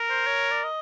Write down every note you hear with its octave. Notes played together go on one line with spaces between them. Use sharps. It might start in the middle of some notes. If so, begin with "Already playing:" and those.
Already playing: A#4
C5
C#5
D5
D#5